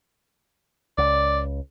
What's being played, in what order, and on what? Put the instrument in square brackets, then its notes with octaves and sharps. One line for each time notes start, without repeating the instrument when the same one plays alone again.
[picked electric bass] C#2 [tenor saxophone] D5